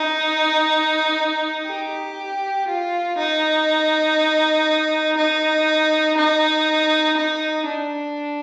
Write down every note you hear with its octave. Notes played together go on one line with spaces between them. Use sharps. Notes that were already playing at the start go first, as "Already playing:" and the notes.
Already playing: D#4
G4
F4
D#4
D#4
D#4
D#4
D4